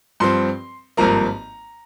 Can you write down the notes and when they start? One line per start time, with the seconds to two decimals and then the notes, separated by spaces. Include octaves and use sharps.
0.20 G2 F3 C4 C6
0.97 G#1 G2 F3 A#3 A#5